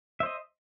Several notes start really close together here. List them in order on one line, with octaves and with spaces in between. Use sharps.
E5 C5 D#5